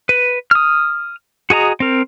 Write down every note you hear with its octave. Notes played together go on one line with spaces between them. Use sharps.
B4
D#6 F6
F#4 G#4 D#5 A#5
C4 A#4